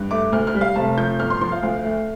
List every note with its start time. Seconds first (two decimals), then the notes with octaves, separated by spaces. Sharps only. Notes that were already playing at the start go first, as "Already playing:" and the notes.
Already playing: G2
0.11 A3 D6
0.32 D2 F6
0.47 F6
0.55 G3
0.61 F5
0.76 F1 A5
0.97 F3 G6
1.19 G1 F6
1.30 C6
1.41 F3 C6
1.52 F5
1.63 D2 F5
1.84 A3